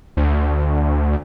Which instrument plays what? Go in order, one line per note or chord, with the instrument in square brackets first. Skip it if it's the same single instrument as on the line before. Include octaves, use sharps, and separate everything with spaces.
[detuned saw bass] D2